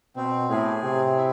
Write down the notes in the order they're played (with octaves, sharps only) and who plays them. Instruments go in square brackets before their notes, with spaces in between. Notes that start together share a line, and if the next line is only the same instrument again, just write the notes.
[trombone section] B2 [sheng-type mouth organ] C4
[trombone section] A2 [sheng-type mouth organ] G#4
[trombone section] C3 [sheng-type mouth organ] C4
[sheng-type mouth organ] E4